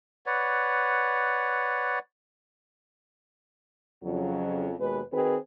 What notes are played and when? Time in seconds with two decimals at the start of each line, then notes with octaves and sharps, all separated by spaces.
0.26 B4 C#5 D5 F#5
4.03 F2 C#3 F#3
4.80 D#2 B2 G#3 B4
5.12 D#3 C4 F#4 G#4 B4